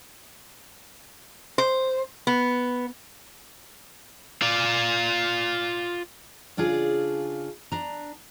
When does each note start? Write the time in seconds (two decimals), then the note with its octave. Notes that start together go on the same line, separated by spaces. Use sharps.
1.58 C5
2.27 B3
4.42 F4 D5
6.57 C#3 D4 F4 G#4
7.72 D4 A#5